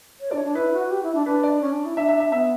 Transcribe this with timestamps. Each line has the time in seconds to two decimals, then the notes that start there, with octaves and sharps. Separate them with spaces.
0.20 C#5
0.31 D4 D5
0.37 C#5
0.44 D4
0.55 E4 B4
0.73 F#4
0.90 G4
1.03 E4
1.14 D4
1.26 D4 B4
1.43 D5
1.61 C#4
1.73 D4
1.85 E4
1.96 D4 E5
2.09 E5
2.20 E5
2.32 B3 E5